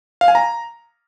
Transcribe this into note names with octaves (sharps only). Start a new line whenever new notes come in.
F5
G#5
A#5